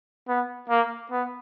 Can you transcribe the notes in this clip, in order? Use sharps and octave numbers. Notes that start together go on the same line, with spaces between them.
B3
A#3
B3